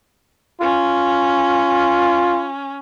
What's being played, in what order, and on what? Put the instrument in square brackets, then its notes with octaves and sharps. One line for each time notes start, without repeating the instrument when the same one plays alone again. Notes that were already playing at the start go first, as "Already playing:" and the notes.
[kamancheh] C#4 [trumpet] F4